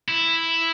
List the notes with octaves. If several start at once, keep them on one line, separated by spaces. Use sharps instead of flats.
E4